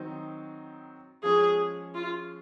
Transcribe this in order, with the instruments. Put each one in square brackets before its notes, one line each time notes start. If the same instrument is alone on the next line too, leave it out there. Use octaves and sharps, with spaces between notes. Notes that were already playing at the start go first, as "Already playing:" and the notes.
Already playing: [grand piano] D#3 F#3 C4 D#4
[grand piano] F3 G#3 C#4 [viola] G#4
[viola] F4